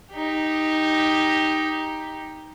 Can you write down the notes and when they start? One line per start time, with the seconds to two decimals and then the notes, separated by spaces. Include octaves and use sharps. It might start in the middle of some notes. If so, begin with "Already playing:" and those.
0.14 D#4 G4